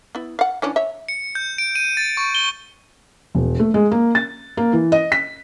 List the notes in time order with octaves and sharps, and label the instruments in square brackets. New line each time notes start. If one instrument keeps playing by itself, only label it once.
[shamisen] B3 E4
F5 F#5
E3 C#4 D4
C#5 E5
[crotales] C#7
G6
D7
D#7
A6
C#6
G7
[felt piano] E1
A3
G#3
A#3
A6
A#3
E3
D#5
B6